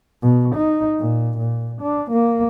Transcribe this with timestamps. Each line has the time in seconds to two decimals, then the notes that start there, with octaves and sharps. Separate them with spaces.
0.22 B2
0.56 D#4
0.98 A#2
1.38 A#2
1.82 D4
2.11 A#3